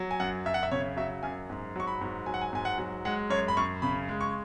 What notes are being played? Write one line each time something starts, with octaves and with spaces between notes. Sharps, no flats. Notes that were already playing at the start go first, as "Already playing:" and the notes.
Already playing: F#3
G#5
F#2 F#5
F#2 E5
F#5
E5
C#3 C#5
F#3 E5
F#2 G#5
G#2
F#3 C#6
B5
G#2
F#3 G#5
F#5
G#5
G#2 G#5
F#5
F#3
G#3 F#5
F#2 C#5
B5
F#2 C#6
C#3 B5
G#3
C#6